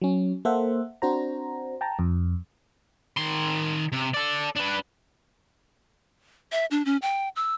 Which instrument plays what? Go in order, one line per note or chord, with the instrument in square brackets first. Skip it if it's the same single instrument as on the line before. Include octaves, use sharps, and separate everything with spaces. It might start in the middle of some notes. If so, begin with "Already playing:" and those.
[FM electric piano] F#3 C#4
A#3 A4 C5 E5 F#5
C4 D4 F#4 C5 A#5
G5 A5 A#5
F2
[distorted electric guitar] D#3 C6
C3
A4 D5
D4 B4
[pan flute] E5
D4
C#4
G5
E6